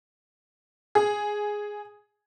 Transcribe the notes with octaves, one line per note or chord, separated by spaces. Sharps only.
G#4